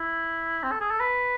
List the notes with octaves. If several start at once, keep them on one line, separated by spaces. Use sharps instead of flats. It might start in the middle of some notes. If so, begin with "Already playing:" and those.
Already playing: E4
C4
A4
G#4
A4
B4